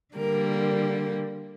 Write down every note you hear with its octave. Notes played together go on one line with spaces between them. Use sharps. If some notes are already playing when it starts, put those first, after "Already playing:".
D3 G3 A#3 A#4